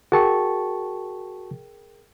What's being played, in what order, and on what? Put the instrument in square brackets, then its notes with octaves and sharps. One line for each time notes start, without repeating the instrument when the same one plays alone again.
[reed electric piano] F#4 A5 C#6 [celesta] G#4 A#4 G5